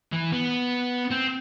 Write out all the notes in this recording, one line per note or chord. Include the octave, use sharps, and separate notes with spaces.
E3
B3
C4